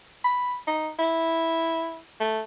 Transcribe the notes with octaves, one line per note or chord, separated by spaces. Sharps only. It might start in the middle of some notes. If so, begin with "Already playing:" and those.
B5
D#4
E4
A3